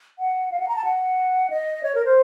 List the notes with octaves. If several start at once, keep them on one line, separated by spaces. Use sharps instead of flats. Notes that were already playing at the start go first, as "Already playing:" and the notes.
F#5
F5
F#5
A#5
A5
F#5
D#5
C#5
A#4
C5